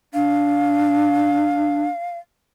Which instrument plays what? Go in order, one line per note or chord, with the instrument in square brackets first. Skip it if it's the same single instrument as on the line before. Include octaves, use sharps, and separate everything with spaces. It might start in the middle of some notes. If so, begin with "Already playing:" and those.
[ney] D4 [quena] F5